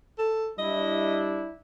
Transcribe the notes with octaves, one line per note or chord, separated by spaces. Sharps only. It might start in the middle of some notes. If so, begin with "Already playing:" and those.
A4
G3 D4 E4 D#5